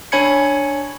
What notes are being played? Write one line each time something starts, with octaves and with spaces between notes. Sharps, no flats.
D4 C#5 G#5 B5 G#6 C#7